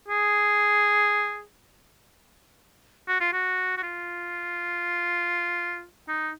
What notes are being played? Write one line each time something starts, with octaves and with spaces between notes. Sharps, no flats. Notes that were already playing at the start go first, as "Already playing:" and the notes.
G#4
F#4
F4
F#4
F#4
F4
D#4